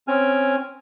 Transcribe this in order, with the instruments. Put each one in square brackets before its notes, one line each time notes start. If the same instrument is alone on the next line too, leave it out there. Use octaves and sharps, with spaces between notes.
[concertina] C4 C#4 G#5 F6